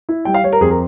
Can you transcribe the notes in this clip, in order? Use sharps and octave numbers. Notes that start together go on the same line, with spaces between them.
E4
G3 G5
F5
G3 C#5
A#4
F2 G#4
A#4